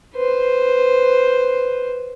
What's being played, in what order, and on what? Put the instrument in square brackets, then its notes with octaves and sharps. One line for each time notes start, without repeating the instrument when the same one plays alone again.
[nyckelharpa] B4 C5